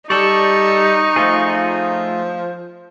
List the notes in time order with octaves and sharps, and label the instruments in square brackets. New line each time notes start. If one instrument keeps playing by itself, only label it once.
[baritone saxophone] G3 [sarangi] D#4 [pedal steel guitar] A4 D5 [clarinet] C#6
[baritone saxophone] F3 [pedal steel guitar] A3 F4 G#4